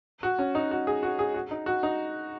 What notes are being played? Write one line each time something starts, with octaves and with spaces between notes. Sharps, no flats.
F#4
C#4
D#4
F#4
G#4
F#4
G#4
F#4
D#4
F#4
D#4